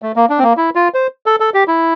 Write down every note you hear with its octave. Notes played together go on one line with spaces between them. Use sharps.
A3
A#3
D4
C4
A#3
E4
F4
C5
A4
A4
G4
E4